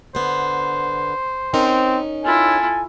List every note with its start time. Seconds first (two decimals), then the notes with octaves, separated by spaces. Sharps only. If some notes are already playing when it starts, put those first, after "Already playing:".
0.15 D3 B3 C5
1.54 C4 C#4 D#4 A#4
2.25 E4 F4 A4 G#5